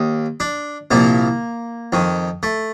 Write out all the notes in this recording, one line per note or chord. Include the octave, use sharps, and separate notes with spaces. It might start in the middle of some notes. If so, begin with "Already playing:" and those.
Already playing: D#2
D4
C2 A#2 F3 A#3
F2 D#3
A3